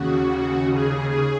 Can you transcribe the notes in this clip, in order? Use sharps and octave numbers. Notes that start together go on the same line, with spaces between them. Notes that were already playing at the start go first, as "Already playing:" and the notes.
Already playing: D#2 C#3 F#4
G#4
G#4